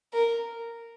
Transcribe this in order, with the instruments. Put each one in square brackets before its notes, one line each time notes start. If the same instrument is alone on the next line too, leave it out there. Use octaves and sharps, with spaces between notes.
[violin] A#4